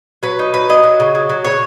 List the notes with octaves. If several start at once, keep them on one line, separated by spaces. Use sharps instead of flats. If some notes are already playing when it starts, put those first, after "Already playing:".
F#3 B4
D#4
F#3 B4
F#3 D#5
F#3
C#3
F#3
F#3
C#3 C#5